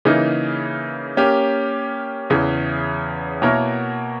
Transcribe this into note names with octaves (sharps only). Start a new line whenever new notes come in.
C#3 E3 A#3 D#4
A#3 C#4 G4
E2 C#3 E3
B2 A#3 E4 A#4 C#5